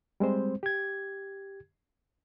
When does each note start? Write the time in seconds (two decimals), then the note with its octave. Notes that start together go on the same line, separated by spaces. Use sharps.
0.20 G3 G#3 C4 C5
0.63 G4 G#6